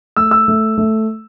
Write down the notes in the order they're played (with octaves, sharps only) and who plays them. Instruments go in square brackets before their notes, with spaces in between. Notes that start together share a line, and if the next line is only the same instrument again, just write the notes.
[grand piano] A3 E6
E6
A3
A3